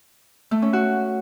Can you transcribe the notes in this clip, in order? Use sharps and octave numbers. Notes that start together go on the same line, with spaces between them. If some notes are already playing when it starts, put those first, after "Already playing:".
A3
C#4
F#4